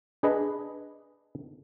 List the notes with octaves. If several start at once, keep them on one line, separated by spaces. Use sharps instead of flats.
D4 G#4 B4 D#5